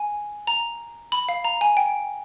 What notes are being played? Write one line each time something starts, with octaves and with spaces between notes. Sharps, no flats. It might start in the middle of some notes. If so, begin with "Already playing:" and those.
Already playing: G#5
A#5
B5
F5
A#5
G#5
G5